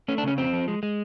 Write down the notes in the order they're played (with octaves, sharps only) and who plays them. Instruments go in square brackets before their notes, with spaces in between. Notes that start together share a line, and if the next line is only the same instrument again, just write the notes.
[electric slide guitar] A3 C#4
D4
C#3 C#4
F2 C4
F3
G#3
G#3